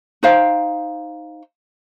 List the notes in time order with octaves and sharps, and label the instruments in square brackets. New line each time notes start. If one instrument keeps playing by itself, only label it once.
[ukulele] D#4 C5 F5 G5